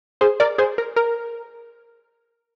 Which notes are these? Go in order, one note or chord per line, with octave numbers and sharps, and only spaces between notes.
G#4 C5
A#4 D5
G#4 C5
A#4
A#4